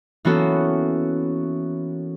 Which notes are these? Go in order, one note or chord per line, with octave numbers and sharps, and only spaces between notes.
E3 A#3 B3 C#4 F#4 A4